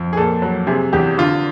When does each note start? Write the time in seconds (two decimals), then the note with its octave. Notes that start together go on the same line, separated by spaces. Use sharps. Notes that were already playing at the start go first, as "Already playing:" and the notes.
Already playing: F2
0.13 G#4
0.17 A#2 A4
0.42 F#3
0.67 C3 G#4
0.93 E2 G4
1.18 D3 F4